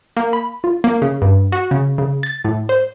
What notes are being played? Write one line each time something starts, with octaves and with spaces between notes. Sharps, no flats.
A#3
B5
F4
A#3
C#3
G2
F#4
C#3
C#3
A6
A2
C5